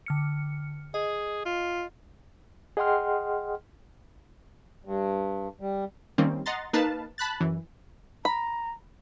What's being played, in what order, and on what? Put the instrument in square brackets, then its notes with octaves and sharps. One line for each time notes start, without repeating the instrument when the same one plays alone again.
[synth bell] D3 F6 C#7
[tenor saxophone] G#4 [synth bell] D#5
[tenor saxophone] F4
[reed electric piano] G#4 D#5 F#5 G5 C6 F6
[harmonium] G2
G3
[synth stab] D#3 G3 A#3 C4 C#4
D#5 F#5 A#5 C6 A6
A#3 D#4 A#4 B4 F5 A5
A5 B5 F#6 A6
F#2 E3
[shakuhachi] A#5 [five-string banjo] B5